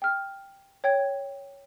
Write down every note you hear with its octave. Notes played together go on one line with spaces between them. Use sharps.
G5 F6
C#5 G5 G#6